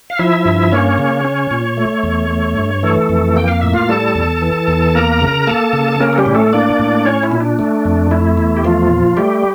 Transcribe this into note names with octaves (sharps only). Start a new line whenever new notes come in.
F5
F3 E4 E5
G2
A#3 C#4 C#5
C#3
C#4
A#2
A3
E2
A3
G2
E3 A3 A4
F2
A#3 G5
F5
A2 E5
F4 F5
G3 A4 A5
E2
E3
E2
A#3 A#4 A#5
C#3
A#3 A4 A5
C#3
A4
A#3 C#4 A#4
A4
G3 G4
A2
A3 A4
A#3 D4 D5
A2
C#4 C#5
E4
A#2
D4
A3
F2
A3 E4
E2
G4
F3 A3 F4
A#2
G3 A3 G4